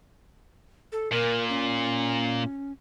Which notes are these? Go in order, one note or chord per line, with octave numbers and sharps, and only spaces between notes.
A4
A#2 A#4
C#4